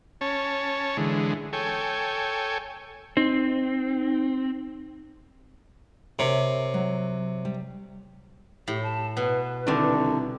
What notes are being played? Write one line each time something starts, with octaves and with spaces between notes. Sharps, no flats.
C#4 C#5 A5
D3 E3 G#3
A4 C#5 G5 G#5
C4 D#4
C3 A#4 C#5 E5
F#3
G3
A2 G4
A5
B2 B4
C2 D3 D#3